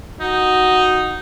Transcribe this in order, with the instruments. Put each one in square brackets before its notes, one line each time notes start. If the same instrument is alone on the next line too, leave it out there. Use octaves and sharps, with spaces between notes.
[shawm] D#4 [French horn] F#4